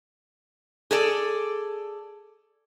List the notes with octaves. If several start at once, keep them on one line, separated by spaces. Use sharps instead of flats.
G#4 A4 D5